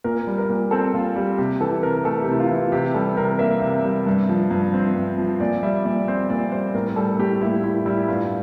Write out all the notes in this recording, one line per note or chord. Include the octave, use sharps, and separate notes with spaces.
A#2 A#4
G3
A#4
A#2
C4 A4
A#2 F4
G3 G4
C3 G4
E3 A4
C3 A#4
A3 A4
G4
C3 E4
F4
E3
F4
C3 G4
G3 A4
C3 A#4
A#3 E5
C3
G3
G2
F3
G2
C4
G2
F3
A#2 D5
G3 E5
A#2 D5
C4 C5
A#2 D5
G3 C5
A2 A#4
G3 A4
A2 G4
A#3 E4
A2 E4
G3 E4
G2 F4